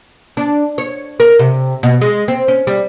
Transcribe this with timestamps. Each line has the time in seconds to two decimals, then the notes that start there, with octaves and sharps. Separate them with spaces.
0.37 D4
0.78 C#5
1.20 A#4
1.39 C3
1.83 B2
2.01 G#3
2.28 C4
2.48 C#4
2.67 G3